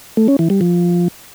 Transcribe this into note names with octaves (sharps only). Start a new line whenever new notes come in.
A3
C#4
E3
G3
F3